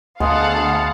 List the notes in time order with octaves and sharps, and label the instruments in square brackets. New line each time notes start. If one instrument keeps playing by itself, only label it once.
[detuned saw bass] D2 [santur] G#3 B3 [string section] F5 F#5 A5